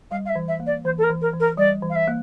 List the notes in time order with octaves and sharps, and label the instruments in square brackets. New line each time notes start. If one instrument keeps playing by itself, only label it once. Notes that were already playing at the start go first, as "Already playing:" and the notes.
[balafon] G3 [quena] F5
[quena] F5
E5
[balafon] E3
[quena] E5
[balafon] A#3
[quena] D5
[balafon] E3 [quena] C5
[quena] A4
A#4
[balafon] E3
[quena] A#4
[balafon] E3
[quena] A#4
[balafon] G3 [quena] D5
[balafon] E3
[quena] F5
E5
[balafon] A#3